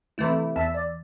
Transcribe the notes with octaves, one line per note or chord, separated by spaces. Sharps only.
C3 E3 A3 E4
E2 E5 A5
D5